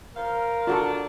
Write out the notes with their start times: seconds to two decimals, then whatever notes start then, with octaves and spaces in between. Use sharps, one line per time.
0.16 F3 A#4 C5 F5
0.67 D#3 D4 F4 F#4 A4